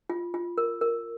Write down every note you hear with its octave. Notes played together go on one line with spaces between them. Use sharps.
F4
F4
A#4
A#4